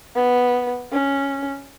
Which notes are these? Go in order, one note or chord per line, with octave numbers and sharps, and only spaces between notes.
B3
C#4